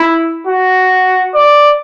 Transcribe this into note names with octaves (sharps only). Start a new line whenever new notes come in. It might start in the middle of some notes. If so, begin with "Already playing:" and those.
Already playing: E4
F#4
D5